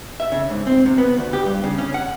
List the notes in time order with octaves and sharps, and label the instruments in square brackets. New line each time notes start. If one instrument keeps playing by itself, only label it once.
[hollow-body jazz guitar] E5
C#3
G#2
C4
C3
B3
D2
G4
G2
C#3
C#4
F#5